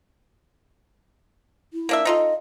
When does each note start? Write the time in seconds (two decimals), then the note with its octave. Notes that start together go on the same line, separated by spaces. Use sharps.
1.73 E4
1.89 A#3 D4 E5
2.05 D#4 F4 A4 D#5